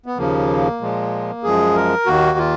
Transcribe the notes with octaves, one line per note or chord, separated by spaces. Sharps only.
B3
D#2 C#3 F3 A#3
A#2 F3 G#3
F#2 F3 G#3 G#4
A#4
D#2 D#3 A#3 F#4
F4